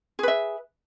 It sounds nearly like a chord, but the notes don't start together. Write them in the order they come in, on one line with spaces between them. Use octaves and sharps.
G#4 B4 E5